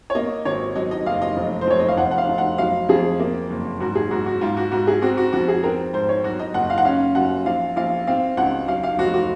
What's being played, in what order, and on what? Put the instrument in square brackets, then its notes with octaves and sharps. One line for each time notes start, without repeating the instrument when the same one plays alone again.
[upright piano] C#5
A#3 D#5
G#1 C#5
F#3 D#5
D#5
F#1 F5
D#5
F1
C5
F1 C#5
D#5
F5
F1 F#5
F#5
F5
F1
F#5
F#3 F5
F2 G#4
A#3
F#1
G#2 F#4
G#4
G#2 F#4
F#4
G#2 F4
F#4
G#2 F#4
G#4
C4 F#4
F#4
F2 F#4
G#4
C4 A#4
G#2 C5
C#5
F#3 F#4
D#5
F#1 F#5
F5
F#5
C#4 F5
F#2 F#5
A#1 F5
A#1 F5
C4 F5
C#2 F#5
F#3 F5
F5
F1 F#4
F#4